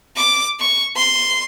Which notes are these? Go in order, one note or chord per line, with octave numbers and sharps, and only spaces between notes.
D6
C#6
C6